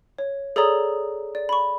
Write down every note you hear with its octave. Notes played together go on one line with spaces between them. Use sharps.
C#5
G#4 A4 C#5 D5 A#5 D#6
D5
B5 C#6